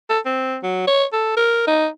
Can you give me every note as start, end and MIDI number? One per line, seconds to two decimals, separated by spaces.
0.10 0.20 69
0.26 0.57 60
0.63 0.85 54
0.87 1.05 73
1.13 1.34 69
1.37 1.66 70
1.67 1.88 63